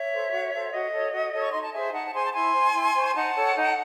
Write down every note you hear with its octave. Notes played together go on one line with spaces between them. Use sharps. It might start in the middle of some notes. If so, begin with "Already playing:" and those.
Already playing: C#5 E5
A4 C5
F#4
A4 C5
F#4 D#5
A4 C#5
F#4
A4 C#5
C#6
D#4 C6
A5
G#4 C5 E5 G#5
D#4 F#5 A5
A5
G#4 C5 G#5 C6
A5
E4 G#5 C6
C5
E4
C5 C#6
C6
D#4 F#5 A5
A4 C#5
D#4